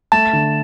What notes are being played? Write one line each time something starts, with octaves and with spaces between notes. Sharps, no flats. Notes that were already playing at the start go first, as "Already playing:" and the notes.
A3 A5
D3